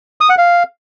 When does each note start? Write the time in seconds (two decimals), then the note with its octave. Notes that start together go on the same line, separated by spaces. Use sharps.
0.21 D#6
0.29 F#5
0.38 F5